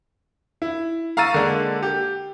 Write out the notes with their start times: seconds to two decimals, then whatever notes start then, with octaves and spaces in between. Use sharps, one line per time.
0.62 E4
1.17 F5 A#5 C#6 E6 A6 D#7
1.34 D3 G#3 A#3 D4
1.83 G4